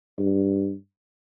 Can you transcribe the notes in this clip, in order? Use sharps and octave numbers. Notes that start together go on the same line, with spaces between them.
G2